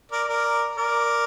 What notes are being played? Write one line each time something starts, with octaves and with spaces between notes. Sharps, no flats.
A#4 D5
A#4 D5
A#4 D5